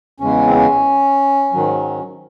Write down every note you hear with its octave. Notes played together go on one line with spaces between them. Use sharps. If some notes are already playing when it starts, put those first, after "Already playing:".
E2 C#3 G#3 C#4
C4
C#4
G#2 D#3 F#3